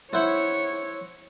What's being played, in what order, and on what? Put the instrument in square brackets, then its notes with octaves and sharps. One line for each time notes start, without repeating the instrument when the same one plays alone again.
[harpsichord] E4 C5 F#5 [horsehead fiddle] C#5